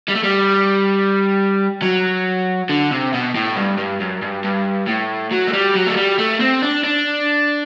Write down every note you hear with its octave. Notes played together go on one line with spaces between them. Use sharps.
G3
A3
G3
F#3
D3
C3
B2
A2
G2
G2
F#2
G2
G2
A2
F#3
A3
G3
F#3
A3
G3
A3
C4
D4
D4